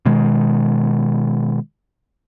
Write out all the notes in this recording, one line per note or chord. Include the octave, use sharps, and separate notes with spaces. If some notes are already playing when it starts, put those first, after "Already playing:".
B2 D#3 G#3